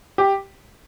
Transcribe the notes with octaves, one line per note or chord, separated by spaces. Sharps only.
G4